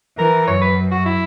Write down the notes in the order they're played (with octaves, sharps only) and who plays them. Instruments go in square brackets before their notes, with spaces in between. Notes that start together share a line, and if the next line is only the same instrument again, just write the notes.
[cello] E3 [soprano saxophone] A#4
[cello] F#2 [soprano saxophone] C#5
[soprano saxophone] B4
F#4
E4